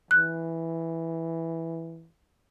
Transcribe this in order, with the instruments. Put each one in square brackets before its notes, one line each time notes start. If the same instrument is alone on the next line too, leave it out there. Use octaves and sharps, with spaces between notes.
[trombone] E3 [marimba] F#6